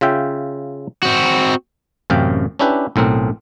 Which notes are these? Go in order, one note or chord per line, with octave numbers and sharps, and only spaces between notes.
C#3 F4 E5 G5
C4 F#4
A1 F#2 C3 F5 G5
C#4 D4 E4 G4 B4
B1 A2 C4 A#4